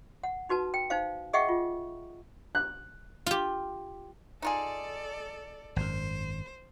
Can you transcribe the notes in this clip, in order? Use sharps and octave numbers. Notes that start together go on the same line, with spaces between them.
F#5
D#4 F#4 B4 A5
G5
D#4 C5 F5
G#4 D#5 E5 F#5 G5 C#6
F4
F#6
F4 G4
D#4 F4 G#4 A4 D5
G#1 F#2 C5